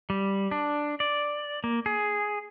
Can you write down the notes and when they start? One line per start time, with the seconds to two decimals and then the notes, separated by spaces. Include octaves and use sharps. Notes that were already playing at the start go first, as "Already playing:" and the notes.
0.10 G3
0.51 D4
1.00 D5
1.64 A#3
1.86 G#4